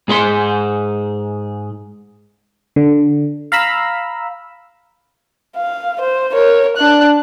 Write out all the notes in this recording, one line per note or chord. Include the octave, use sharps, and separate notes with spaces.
G#2 G#4 B4 C6
D3
F5 A#5 B5 E6
F5
C5
A#4 C#5
D4 F#6